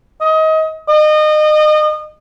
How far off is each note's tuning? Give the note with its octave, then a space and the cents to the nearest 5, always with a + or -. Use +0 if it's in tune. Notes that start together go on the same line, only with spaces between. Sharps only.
D#5 +25
D#5 -30